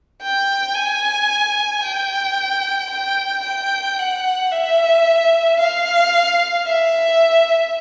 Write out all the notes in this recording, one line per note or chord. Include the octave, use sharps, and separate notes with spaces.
G5
G#5
G5
G5
G5
F#5
E5
F5
E5